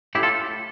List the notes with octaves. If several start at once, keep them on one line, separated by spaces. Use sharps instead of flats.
A2 E4 G4
F4 A4